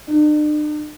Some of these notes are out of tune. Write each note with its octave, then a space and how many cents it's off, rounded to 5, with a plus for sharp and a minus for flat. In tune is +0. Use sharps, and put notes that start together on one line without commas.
D4 +45